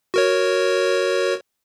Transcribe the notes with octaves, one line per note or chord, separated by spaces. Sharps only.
F#4 A#4 C#5